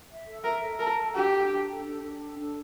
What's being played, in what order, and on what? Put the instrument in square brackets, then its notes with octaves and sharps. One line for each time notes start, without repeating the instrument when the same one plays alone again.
[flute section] E5
A4
[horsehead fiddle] A#4 [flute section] E5
[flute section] A4
[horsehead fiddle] A#4 [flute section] A5
[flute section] A4
[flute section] D4 [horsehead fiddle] G4
[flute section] A4
D4
A4
D4
D4
A4
D4